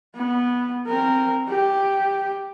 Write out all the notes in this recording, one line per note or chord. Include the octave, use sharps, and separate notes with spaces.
B3
C4 A#4
G4